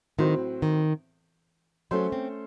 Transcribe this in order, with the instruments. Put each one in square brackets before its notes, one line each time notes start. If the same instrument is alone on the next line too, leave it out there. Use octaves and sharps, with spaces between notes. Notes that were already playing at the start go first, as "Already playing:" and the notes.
[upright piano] A2 F#3 C4 F#4 C5 [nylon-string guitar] D#3
[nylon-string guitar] D#3
[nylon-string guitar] F#3 [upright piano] A3 C#4 A4 C5
[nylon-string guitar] C4